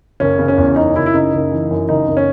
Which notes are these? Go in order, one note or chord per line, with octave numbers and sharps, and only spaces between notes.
F#1 C#4
C#3
C#4
E2
F#1 D#4
F#1 E4
E4
C#3 D#4
F#1
E3
F#2
F#1 D#4
F#1
C#4